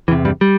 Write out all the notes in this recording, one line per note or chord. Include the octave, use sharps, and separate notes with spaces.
E2 C3 E3
G2 G3
G3